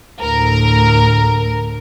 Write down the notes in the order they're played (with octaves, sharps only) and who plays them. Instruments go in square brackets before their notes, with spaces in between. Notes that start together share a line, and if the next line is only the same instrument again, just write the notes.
[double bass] D2 A2 [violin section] A#4